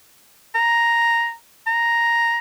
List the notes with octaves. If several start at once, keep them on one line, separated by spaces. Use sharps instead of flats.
A#5
A#5